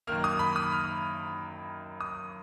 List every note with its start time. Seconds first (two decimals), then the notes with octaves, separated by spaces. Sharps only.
0.07 F#2 D#3 A#3 F6
0.24 D#6
0.39 B5
0.56 D#6
0.72 F6
2.01 D#6